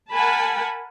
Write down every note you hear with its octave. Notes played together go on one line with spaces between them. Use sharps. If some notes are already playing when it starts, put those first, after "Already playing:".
A#4 F#5 G#5 A5 B5